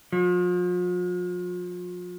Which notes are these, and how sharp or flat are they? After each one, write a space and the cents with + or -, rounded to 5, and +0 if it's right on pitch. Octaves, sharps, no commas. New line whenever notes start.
F3 +40